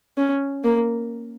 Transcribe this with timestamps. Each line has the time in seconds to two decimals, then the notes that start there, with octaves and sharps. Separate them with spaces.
0.18 C#4
0.64 A#3